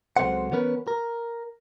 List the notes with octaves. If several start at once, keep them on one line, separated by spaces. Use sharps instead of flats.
C#2 F#3 C4 A4 C5 F#5
E3 B3 C#4 A#4 B4
A#4